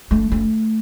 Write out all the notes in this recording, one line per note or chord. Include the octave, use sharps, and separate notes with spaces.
A3
A3